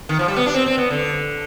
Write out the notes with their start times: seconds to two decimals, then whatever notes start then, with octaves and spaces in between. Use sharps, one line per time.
0.09 D#3
0.19 F3
0.28 G3
0.36 B3
0.46 D4
0.54 C4
0.66 C4
0.78 B3
0.91 D3